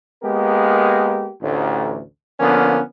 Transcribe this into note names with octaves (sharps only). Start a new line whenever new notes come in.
G#3 A#3 B3 G4 A#4
A1 D2
D3 F3 A#3 B3 C#4